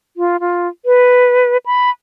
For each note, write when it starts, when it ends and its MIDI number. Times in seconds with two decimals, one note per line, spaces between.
0.17 0.37 65
0.40 0.68 65
0.86 1.57 71
1.66 1.90 83